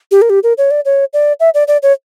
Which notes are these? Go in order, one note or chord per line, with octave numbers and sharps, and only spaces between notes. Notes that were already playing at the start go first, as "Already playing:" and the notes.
G4
A#4
G4
A#4
C#5
D5
C#5
D5
E5
D5
D5
C#5